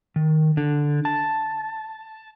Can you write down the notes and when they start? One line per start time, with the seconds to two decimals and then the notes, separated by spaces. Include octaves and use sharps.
0.16 D#3
0.57 D3
1.05 A5